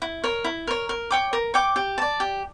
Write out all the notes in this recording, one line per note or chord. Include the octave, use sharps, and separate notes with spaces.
E4
A#4 C#5
E4
A#4 C#5
A#4
C#5 G5 D6
A#4
C#5 G5 D6
G4
D5 A5
G4